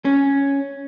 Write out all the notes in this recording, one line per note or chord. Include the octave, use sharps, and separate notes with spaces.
C#4